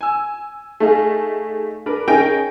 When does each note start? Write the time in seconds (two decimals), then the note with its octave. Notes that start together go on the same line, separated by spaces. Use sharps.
0.01 G#5 E6
0.80 A3 D#4 G#4 F5
1.86 D4 A#4 B4
2.08 C#4 D#4 G#4 A#4 G5